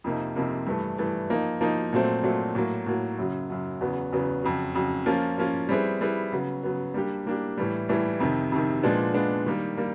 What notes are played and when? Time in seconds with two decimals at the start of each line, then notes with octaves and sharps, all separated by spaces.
0.04 F2 C3 F3 A#3 D#4
0.36 F2 C3 F3 A#3 D#4
0.67 G2 E3 A3
0.98 G2 E3 A3
1.30 F3 A#3 D#4
1.61 F3 A#3 D#4
1.93 A#2 F#3 A3 C4
2.23 A#2 F#3 A3 C4
2.55 A2 F#3 A#3
2.86 A2 F#3 A#3
3.18 F#2 C#3 F#3
3.50 F#2 C#3 F#3
3.81 E2 C#3 F#3 B3
4.12 E2 C#3 F#3 B3
4.43 F2 C#3 F#3
4.74 F2 C#3 F#3
5.06 F3 A#3 C#4 F4
5.38 F3 A#3 C#4 F4
5.69 G3 C4 E4 G#4 B4
6.01 G3 C4 E4 G#4 B4
6.32 C#3 F#3 B3
6.63 C#3 F#3 B3
6.94 G3 A#3 D4 G4
7.26 G3 A#3 D4 G4
7.58 A2 E3 G3
7.89 A2 E3 G3
8.20 F2 C3 D#3
8.52 F2 C3 D#3
8.83 A#2 F3 G#3 B3 D4
9.14 A#2 F3 G#3 B3 D4
9.46 D#3 G3 A#3
9.77 G3 A#3